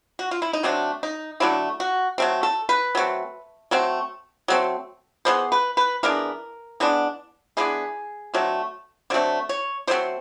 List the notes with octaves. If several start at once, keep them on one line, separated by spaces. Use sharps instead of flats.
F#4
F4
E4
D#4
D3 F#3 A3 C4 D4
D#4
D3 F#3 A3 C4 E4
F#4
F#3 A3 C4
A4
B4
F#3 A3 C4
F#3 A3 C4
F#3 A3 C4
E3 G#3 B3 D4 C5
B4
B4
E3 G#3 B3 D4 A#4
E3 G#3 B3 D4
E3 G#3 B3 D4 G#4
D3 F#3 A3 C4
D3 F#3 A3 C4 C#5
C#5
D3 F#3 A3 C4 C5